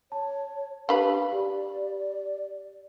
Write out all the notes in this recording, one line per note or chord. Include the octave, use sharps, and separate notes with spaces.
C#5 A5
D4 G4 B4 F5 B5
G4 D5